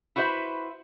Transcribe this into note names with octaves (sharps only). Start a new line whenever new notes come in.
E4 F#4 B4 C5 E5